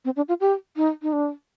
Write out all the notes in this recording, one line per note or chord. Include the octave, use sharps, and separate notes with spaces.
C4
D4
F4
G4
D#4
D#4
D4